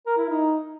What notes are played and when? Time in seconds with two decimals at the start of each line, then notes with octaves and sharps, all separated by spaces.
0.06 A#4
0.18 E4
0.29 D#4